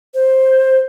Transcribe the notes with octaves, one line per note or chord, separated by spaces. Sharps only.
C5